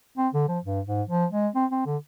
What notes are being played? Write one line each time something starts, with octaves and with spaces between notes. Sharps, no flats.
C4
D3
F3
G2
G#2
F3
G#3
C4
C4
D3